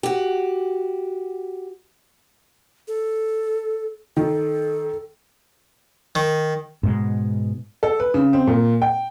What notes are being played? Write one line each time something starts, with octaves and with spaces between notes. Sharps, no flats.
F#4 G4
A4
D#3 A4
D#3
G#2 B2 G#3
A4
B4
C#3
C4
A#2
G5